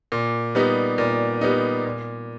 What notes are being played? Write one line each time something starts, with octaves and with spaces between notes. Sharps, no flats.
A#2
G3 B3 D#4
A#2
G3 B3 D#4
A#2